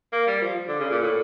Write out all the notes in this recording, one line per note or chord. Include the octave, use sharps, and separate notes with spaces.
A#3
G3
F3
D3
C#3
A#2
A2